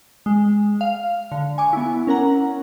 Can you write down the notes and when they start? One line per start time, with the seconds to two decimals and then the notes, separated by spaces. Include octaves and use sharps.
0.26 G#3
0.81 F5
1.32 D3
1.58 G#5 C#6 D6
1.73 B3 E4
2.07 C#4 A#4 F#5 A#5